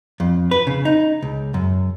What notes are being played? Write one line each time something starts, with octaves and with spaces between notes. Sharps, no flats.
F2
B4
C#3
D#4
C#2
F#2